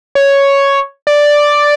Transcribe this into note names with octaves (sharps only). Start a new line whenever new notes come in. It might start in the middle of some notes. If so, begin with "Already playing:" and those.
C#5
D5